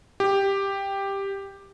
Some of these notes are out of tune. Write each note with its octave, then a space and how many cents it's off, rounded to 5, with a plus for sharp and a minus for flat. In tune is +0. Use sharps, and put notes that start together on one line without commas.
G4 +5